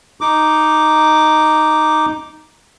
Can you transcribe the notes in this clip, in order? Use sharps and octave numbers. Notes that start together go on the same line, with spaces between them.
D#4 D6